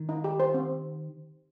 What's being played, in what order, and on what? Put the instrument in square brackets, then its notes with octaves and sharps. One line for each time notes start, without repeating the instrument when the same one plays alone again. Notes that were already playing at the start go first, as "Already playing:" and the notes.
Already playing: [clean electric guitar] D#3
[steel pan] D#4
G4
C5
C4